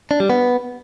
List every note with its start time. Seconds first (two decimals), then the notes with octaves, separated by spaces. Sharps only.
0.11 D4
0.20 G3
0.30 B3